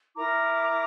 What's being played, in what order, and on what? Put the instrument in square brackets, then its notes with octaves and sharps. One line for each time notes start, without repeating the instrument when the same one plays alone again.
[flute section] E4 A#4 A#5 D6